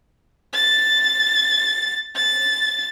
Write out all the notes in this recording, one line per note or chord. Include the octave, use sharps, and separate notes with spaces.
A6
A6